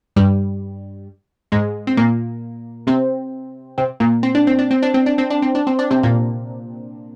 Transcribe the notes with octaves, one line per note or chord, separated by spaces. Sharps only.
G2 G3
G#2 G#3
C4
A#2 A#3
C3 C4
C3 C4
A#2 A#3
C4
D4
C4
D4
C4
D4
C4
D4
C4
D4
C4
D4
C4
D4
C3 C4
A#2 A#3